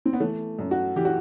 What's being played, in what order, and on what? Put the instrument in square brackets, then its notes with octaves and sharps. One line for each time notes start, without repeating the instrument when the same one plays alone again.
[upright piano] C4
B3
E3 A3
F#2
F#4
E3 G4
F#4